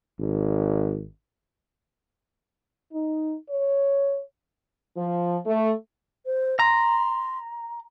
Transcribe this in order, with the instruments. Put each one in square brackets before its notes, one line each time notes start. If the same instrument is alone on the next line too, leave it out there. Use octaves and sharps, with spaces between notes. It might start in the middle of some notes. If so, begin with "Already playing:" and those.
[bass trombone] G#1
[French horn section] D#4
C#5
F3
A3
[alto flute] C5
[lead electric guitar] A#5 [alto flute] C6